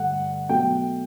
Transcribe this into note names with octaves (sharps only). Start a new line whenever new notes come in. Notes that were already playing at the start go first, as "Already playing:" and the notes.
Already playing: G2 D3 A3 F#5
B2 F#3 A3 G5